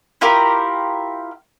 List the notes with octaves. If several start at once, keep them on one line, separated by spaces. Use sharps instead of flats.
E4 F4 G4 A#4